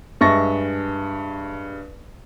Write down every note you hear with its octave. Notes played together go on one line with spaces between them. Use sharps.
G2 G#3 E5 C#6 A6 A#6